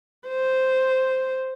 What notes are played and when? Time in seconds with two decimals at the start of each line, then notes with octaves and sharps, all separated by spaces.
0.28 C5